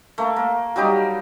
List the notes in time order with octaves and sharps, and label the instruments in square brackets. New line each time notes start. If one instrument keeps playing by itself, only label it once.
[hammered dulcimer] A3 A#3
A#3
F#3 G3 D#4 G4